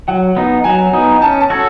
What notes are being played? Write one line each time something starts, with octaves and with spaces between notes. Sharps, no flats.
F#3 F#5
B3 D#4
F#3 G#5
B3 D#4
C#4 A5
A5
F#4 A4 C#5